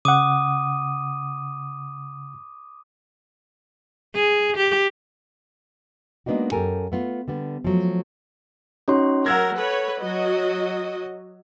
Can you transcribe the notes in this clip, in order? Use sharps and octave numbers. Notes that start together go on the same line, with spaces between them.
C#3 F#5 D6 D#6 D#7
G#4
G4
G#3 A#3 B3 D4 D#4 F#4
F#2 G4 A4 A#4 G#5
A3 B3 F4
D3 G3 B3
F3 F#3 A3
C#4 D#4 F#4 C#5 C6
F#3 A#4 F#5 E6 G#6 A#6
A4 B4 C#5
F#3 F#4 D#5